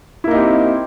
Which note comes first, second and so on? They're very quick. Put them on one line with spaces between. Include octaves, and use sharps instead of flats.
E4 A#3 D#4 G4 C4